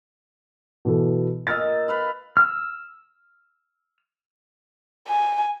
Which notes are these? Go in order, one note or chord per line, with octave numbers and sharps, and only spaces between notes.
B2 E3 A4
A#2 D#5 E6 F6 A6
B4 F5 B5
E6 F6
G#5